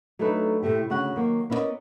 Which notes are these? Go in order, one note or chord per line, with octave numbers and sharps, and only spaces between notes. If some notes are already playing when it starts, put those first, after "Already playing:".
F#3 A3 D4 D#4 A4 B4
A2 C3 A3 G4
D2 C#3 F#4 F#5
D#3 F#3 A#3
B3 C#4 E4 A#4 D5 D#5